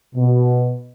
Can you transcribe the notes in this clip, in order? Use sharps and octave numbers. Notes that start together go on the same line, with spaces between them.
B2